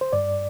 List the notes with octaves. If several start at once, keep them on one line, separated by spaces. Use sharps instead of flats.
C5
G2 D5